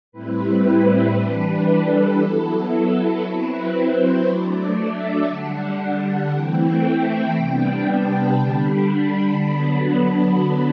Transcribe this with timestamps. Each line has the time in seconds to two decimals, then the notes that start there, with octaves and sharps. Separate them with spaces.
0.12 A2 G3 C4 E4 B4
0.65 B4
1.16 E3 G3 D4 B4
1.68 A4
2.19 F#3 B3 E4
2.71 A4
3.22 F#3 C4 E4 B4
3.73 C5
4.25 F#3 A3 D4 D5
4.78 E5
5.28 D3 G3 D4 F#5
6.32 E3 A3 C4 E4 G5
7.36 C3 G3 B3 D4
7.87 A5
8.38 D3 G3 D4 B5
9.42 D3 F#3 B3 D4
9.94 B5